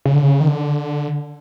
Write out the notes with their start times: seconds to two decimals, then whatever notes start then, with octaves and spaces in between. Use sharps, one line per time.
0.06 C#3
0.14 D3
0.22 C#3
0.40 D#3
0.48 D3